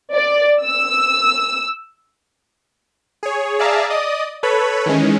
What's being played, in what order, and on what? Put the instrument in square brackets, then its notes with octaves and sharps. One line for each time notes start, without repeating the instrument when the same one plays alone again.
[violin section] D5
E6
[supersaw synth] G#4 C#5
G#4 D5 E5 F5 A5 A#5
D5 D#5 D#6
A4 B4 C#5 B5
D#3 E3 G#3 C#4